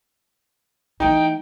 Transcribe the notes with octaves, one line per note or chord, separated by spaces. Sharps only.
E3 A3 D#4 G5